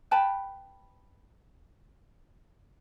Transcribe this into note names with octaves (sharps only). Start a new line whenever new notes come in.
B4 G5 A5 B5